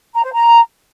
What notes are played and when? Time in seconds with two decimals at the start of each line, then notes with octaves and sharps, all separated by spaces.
0.14 A#5
0.24 C5
0.33 A#5